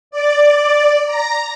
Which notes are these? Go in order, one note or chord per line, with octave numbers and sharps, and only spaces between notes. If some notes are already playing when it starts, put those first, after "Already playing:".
D5
A#5